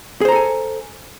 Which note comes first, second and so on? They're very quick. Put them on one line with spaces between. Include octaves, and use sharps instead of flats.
G#4 C5 A#5 A4 G#5